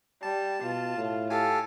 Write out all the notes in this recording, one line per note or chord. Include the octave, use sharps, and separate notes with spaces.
G3 A5
B2 F4
A2
G4 A4 F5 G#5